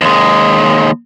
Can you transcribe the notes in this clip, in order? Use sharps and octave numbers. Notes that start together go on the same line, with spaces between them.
D#2 G#3